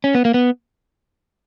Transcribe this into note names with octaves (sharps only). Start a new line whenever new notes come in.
C#4
B3
A#3
B3